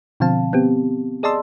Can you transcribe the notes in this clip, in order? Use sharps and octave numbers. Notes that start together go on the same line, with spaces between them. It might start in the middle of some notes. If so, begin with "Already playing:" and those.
B2 D3 F3 C4 F5 A5
B3 C4 G4
G#4 D5 D#5 A5 C6 E6